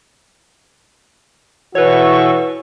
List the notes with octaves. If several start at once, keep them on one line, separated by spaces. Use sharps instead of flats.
B2 E3 F#4 A4 B4 C#5 C#6